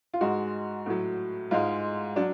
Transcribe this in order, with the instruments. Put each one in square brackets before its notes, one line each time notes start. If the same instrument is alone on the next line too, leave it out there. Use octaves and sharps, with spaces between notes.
[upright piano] F4
G#2 G#3 F#4
A2 F#3
G#2 G#3 F4
F#3 D4